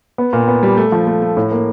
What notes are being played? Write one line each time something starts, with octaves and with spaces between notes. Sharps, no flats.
B3
A#2
B3
G3
A3
F3
A3
A3
A2
A#3